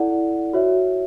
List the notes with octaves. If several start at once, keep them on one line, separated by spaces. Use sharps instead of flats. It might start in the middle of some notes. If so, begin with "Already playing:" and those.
Already playing: E4 A4 D5 F#5
F#4 C#5 E5